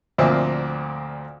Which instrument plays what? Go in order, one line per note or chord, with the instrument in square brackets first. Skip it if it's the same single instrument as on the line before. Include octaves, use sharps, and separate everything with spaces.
[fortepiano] D2 A#2 F3 A#3 C4 E5